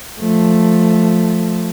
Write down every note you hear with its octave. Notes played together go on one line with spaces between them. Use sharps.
F3 A3